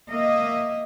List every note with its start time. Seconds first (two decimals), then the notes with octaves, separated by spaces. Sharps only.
0.10 A#3 D#5 E5